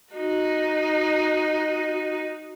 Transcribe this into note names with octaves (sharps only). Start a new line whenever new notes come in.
D#4 F#4